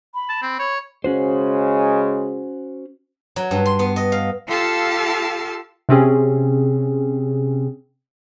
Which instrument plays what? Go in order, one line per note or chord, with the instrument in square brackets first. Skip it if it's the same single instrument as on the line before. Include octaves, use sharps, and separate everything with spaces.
[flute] B5
[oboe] A5
C4
C#5
[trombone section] C#3 G#3 [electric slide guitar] C#4 F#4 C5
[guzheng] F#3
G2
C6
B3
D#5
F5
[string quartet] F4 G4 A4 F5 A5 E6
[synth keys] C3 C4 C#4 G#4